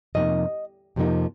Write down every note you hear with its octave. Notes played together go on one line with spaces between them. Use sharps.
F2 C3 F3 A#3 D#4 D#5
F2 C3 F3 A#3 D#4